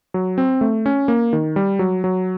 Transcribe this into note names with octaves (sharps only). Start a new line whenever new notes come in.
F#3
C4
A3
C#4
A#3
D#3
G3
F#3
F#3